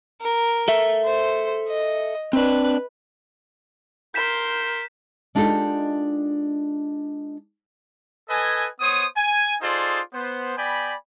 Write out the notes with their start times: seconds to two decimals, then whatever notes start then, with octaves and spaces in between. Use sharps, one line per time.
0.21 A#4
0.68 A4 E5
1.05 C5
1.68 D#5
2.33 C4 D4 B4
4.14 A#4 C6 G6 B6 E7
5.35 G#3 D4 D#4 F4 G4 A4
8.30 A4 B4 D#5 G#5
8.81 B3 C5 C#5 D#6
9.16 G#5
9.62 D#4 F4 G#4 A4 C5 D5
10.13 B3 C5
10.57 B3 D5 G5 G#5 B5